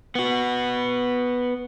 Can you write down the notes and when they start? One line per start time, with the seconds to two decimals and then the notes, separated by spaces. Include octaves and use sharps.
0.15 B3 F#4